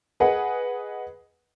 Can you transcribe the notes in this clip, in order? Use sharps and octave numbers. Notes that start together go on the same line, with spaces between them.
G#4 B4 D#5 F#5